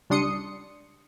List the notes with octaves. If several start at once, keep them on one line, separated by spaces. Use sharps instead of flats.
C#2 G3 D4 C6 D#6 C#7